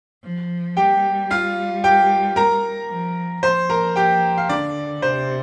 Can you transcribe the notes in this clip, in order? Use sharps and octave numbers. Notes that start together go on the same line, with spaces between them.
F3
G3 G4 G5
F4 F5
G4 G5
A#4 A#5
F3
F3 C5 C6
A#4 A#5
G4 G5
F5
D3 D4 D5
C3 C5